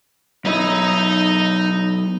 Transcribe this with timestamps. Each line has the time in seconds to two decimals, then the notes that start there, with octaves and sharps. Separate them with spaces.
0.45 B1 D#4 E4 D#5